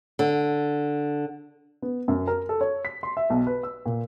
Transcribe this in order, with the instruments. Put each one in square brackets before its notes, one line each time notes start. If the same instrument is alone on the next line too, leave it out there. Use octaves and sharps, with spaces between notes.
[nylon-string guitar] D3
[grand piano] B3
F#2
A#4
A4
C#5
B6
C6
E5
B1
B4
E6
A#2